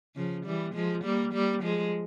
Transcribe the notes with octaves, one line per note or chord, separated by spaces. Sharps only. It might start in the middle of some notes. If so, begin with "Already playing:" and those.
C#3 F3
E3 G3
F3 G#3
G3 A#3
G3 A#3
F3 G#3